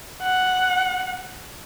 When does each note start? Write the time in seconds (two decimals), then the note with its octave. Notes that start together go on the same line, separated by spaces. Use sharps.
0.23 F#5